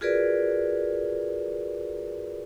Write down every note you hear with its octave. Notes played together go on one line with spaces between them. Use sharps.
F4 F#4 G#4 A#4 B4 D5